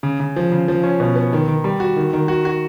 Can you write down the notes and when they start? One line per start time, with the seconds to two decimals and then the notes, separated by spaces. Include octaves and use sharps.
0.03 C#3
0.20 C#3
0.36 F3
0.52 C#3
0.68 F3
0.84 C#4
1.00 B2
1.16 B3
1.33 D#3
1.48 D#3
1.64 G3
1.80 F#4
1.96 D#3
2.13 D#3
2.28 F#4
2.45 F#4